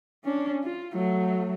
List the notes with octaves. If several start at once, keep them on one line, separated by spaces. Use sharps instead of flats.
C#4 D4
F4
F#3 A3